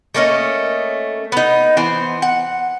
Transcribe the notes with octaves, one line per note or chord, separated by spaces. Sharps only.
A3 A#3 C#4 D#5
B3 D#4
E3 B3 C5
F#5